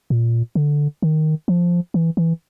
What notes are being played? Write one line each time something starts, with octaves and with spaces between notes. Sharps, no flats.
A#2
D3
D#3
F3
E3
E3